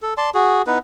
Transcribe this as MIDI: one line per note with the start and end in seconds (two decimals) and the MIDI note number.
0.02 0.14 69
0.17 0.30 74
0.17 0.30 81
0.17 0.30 84
0.34 0.62 66
0.34 0.62 68
0.67 0.79 59
0.67 0.79 63
0.67 0.79 64
0.67 0.79 71